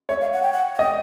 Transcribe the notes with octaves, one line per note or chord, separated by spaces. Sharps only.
C#5 E5
F5
F#5
G5
F#5
F#5
D#5 G5